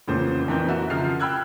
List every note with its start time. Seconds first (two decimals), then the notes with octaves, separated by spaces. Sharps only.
0.08 F1 A#2 C#3 E3 C#4 C5
0.48 F2 E3 A#4 G6
0.68 F#4 A#4 D#5 E5
0.90 C#3 F3 F6 C7
1.20 G5 B5 E6 F#6 G#6